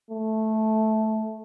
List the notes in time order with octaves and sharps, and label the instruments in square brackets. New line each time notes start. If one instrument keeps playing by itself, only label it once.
[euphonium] A3